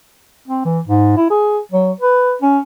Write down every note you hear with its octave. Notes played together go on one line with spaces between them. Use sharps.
C4
E3
G#2
E4
G#4
F#3
B4
C#4